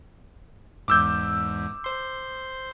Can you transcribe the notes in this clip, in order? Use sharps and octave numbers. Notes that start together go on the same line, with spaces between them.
E2 G#2 D6 E6 G6
C5 C6